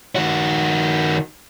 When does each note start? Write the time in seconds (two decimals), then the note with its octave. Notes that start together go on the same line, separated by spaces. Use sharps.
0.16 D#3 F#4